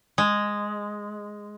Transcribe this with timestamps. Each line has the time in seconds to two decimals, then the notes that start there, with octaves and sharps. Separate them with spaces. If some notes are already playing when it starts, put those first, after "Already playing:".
0.18 G#3